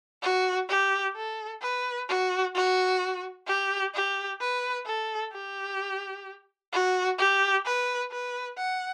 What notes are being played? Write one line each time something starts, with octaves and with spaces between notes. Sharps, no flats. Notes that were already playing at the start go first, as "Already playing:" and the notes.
F#4
G4
A4
B4
F#4
F#4
G4
G4
B4
A4
G4
F#4
G4
B4
B4
F#5